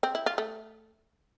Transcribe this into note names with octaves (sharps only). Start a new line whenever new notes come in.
C4
E4
F4
A3